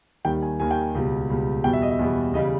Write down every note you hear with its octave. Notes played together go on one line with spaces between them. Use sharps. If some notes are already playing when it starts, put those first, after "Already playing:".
D#2 D#3 G3 G5
G#5
D#2 D#3 G3 G#5
G5
C#2 B2 G3
C#2 B2 G3
E2 B2 G3 G5
E5
D#5
E5
E2 B2 G3
E2 C#3 G3 D#5